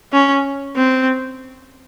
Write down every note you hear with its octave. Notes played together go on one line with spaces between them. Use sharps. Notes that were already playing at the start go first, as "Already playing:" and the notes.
C#4
C4